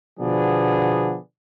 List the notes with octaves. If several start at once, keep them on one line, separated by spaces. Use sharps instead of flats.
B2 D3 F3 B3 D4 G#4